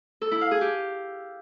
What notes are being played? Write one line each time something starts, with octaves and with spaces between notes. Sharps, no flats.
A4
E4
F5
G#4
G4